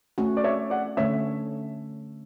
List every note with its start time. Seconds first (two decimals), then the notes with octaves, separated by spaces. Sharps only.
0.18 A3 C#4 F#4
0.37 D5
0.44 C#5 E5
0.70 D5 F#5
0.97 D3 A3 C#4 C#5 E5